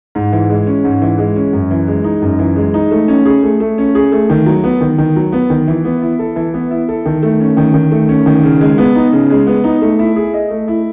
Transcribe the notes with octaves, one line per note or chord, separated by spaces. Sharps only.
G#2
E3
G#3
C#4
G#2
E3
G#3
C#4
F#2
E3
G#3
D#4
F#2
E3
G#3
D#4
A3
C#4
G#4
A3
A3
C#4
G#4
A3
D#3
F#3
B3
D#3
D#3
F#3
B3
D#3
E3
B3
E4
A4
E3
B3
E4
A4
D#3
A3
C#4
D#3
D#3
A3
C#4
D#3
C#3
G#3
B3
D#4
C#3
G#3
B3
D#4
A3
E4
G#4
D#5
A3
E4